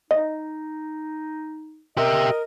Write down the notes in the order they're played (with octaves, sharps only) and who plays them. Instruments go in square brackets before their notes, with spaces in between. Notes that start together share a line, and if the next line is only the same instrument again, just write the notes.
[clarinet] D#4 [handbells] D#5
[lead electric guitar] G4 E5 [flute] A#4 [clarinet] D#5